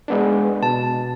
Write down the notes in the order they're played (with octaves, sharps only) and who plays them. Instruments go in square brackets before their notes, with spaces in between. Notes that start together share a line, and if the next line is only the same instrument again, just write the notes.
[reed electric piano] G#3 B3 D4
[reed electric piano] B2 [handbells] A5